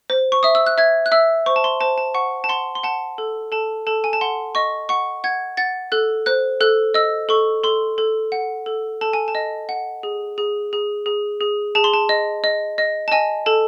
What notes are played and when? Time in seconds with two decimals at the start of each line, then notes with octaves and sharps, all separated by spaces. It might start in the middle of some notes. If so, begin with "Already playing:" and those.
0.10 C5
0.32 C#6
0.43 E5 D#6
0.55 E6
0.66 F#6
0.78 E5 G#6
1.06 F#6
1.12 E5 E6
1.46 C5 C#6
1.56 A5
1.64 C6
1.81 C5 A5
1.98 A5
2.14 F#5 C#6
2.44 A5
2.49 F#5 C6
2.75 C6
2.83 F#5 A5
3.18 A4
3.52 A4 A5
3.87 A4 A5
4.04 G#5
4.13 A5
4.21 F#5 C6
4.55 D#5 C#6
4.89 F#5 C#6
5.24 F#5 G#6
5.57 F#5 A6
5.92 A4 F#6
6.26 C5 F#6
6.61 A4 F#6
6.94 D#5 E6
7.29 A4 C#6
7.64 A4 C6
7.98 A4
8.32 F#5
8.66 A4
9.01 A4 A5
9.13 G#5
9.28 A5
9.35 D#5
9.69 F#5
10.03 G#4
10.38 G#4
10.73 G#4
11.06 G#4
11.41 G#4
11.75 G#4 A5
11.84 C6
11.94 A5
12.09 D#5
12.44 D#5
12.78 D#5
13.08 A5
13.12 D#5 G#5
13.46 A4 A5